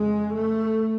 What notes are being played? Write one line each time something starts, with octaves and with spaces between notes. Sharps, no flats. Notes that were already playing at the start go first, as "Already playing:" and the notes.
Already playing: F2 C#3 G#3
A3